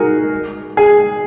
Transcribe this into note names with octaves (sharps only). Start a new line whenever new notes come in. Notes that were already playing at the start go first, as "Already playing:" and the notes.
Already playing: D#4 F#4 G#4 A#4
G#4